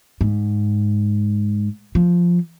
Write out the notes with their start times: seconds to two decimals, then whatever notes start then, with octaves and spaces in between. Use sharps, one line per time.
0.21 G#2
1.95 F3